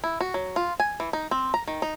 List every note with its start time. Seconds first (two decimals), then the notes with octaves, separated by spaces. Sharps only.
0.04 E4
0.21 F#4
0.34 F#3
0.56 F4
0.80 G#5
1.00 E3
1.13 D#4
1.31 C4
1.54 A#5
1.68 D#3
1.82 D#4